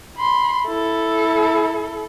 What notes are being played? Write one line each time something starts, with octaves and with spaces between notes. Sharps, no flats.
B5 C6
E4 A4